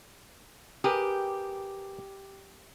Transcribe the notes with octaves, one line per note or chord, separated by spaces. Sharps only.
G4 G#4 A#4 B4